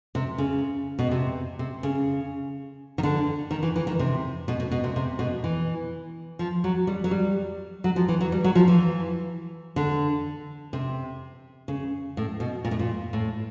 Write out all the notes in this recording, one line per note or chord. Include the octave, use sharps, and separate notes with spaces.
C3
C#3
B2
C3
C3
C#3
D#3
D3
D#3
E3
E3
D#3
C3
B2
B2
B2
C3
C3
B2
E3
F3
F#3
G3
F#3
G3
F#3
F3
E3
F#3
G3
F#3
F3
E3
D3
C3
C#3
A2
B2
A#2
A2
A#2
A2